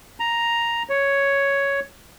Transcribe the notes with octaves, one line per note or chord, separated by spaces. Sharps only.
A#5
C#5